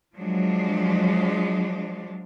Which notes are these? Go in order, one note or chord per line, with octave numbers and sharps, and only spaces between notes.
F3 F#3 G#3 D4